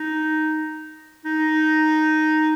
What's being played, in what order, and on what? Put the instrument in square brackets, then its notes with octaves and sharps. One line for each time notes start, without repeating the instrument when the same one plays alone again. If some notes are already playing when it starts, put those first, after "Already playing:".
Already playing: [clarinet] D#4
D#4